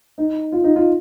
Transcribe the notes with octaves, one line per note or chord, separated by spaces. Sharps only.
D#4
F4
D#4
F4